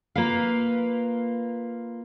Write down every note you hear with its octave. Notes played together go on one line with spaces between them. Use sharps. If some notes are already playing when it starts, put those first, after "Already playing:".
A#3 F4 B4 F5